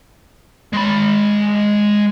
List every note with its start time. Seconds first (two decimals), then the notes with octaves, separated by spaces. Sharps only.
0.73 G#3 B5